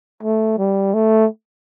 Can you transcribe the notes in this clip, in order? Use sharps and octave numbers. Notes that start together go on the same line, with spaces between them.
A3
G3
A3